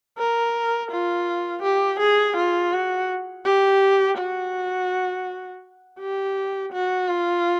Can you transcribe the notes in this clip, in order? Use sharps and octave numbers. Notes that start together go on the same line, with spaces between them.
A#4
F4
G4
G#4
F4
F#4
G4
F#4
G4
F#4
F4